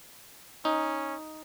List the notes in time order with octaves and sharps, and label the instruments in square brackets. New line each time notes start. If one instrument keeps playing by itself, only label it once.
[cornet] C#4 [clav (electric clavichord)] D#4